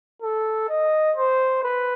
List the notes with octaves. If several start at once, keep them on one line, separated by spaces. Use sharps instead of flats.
A4
D#5
C5
B4